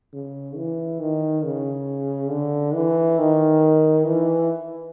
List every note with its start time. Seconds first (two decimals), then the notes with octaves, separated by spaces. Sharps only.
0.13 C#3
0.56 E3
1.00 D#3
1.45 C#3
2.31 D3
2.74 E3
3.19 D#3
4.05 E3